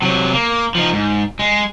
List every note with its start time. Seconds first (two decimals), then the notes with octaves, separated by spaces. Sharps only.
0.02 C3 F#3
0.33 A#3
0.75 F3 D#4
0.93 G#2
1.39 G#3